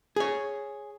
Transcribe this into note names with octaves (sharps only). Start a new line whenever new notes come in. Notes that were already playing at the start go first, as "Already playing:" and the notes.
G#4 C#5